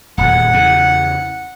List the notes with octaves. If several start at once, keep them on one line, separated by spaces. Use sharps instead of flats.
D#1 E2 F#5
E2 C#3